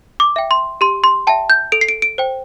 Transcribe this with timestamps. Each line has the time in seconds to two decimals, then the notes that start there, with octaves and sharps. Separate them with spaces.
0.20 D6
0.36 E5 G5
0.51 C6
0.81 G4 C6
1.04 C6
1.27 E5 G5 A5
1.50 G6
1.72 A4 D7
1.81 C7
1.89 D7
2.02 D7
2.18 C5 G5